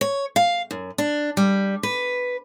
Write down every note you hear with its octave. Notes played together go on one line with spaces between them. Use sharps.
C#5
F5
F#2
D4
G3
B4